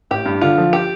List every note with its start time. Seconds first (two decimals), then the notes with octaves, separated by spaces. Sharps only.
0.11 A1 G4
0.26 G2
0.41 D3 F4
0.58 F3
0.73 G4